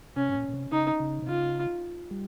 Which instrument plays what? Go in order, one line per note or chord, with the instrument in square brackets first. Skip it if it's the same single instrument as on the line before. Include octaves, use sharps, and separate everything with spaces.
[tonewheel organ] C3 [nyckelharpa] C#4
[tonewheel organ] G#2
A#2
A#2
C3
[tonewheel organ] C#3 [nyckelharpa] D#4
[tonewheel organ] C#3
C3
[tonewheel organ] C#3 [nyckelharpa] F4
[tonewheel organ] G3